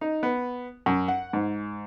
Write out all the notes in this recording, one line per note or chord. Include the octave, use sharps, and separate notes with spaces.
D#4
B3
F#2
F#5
G#2